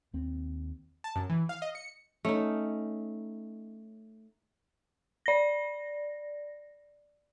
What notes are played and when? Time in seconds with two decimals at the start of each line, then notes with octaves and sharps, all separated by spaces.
0.14 D#2 C4
1.04 A5
1.16 F#2
1.30 E3
1.49 F5
1.62 D#5
1.75 C#7
2.25 A3 C#4 D#4
5.26 D5 A#6